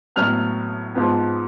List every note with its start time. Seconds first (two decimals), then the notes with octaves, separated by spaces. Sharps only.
0.16 A2 F#3 B3 F6
0.95 G#2 F3 B3